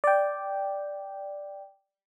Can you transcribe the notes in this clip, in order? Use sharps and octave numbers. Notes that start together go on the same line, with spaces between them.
D5 G5